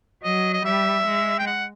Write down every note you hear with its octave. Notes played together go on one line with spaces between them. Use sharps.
F#3 D#5
D#5
G3 E5
G#3
G5
F#5